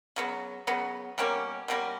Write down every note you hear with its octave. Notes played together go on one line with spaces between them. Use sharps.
C#3 F#3 B3
C#3 F#3 B3
B2 G3 A#3 C#4
B2 G3 A#3 C#4